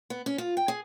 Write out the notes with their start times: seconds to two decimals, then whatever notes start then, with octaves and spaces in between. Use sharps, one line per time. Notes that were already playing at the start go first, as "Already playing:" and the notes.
0.10 B3
0.26 C#4
0.38 F4
0.57 G5
0.68 G#4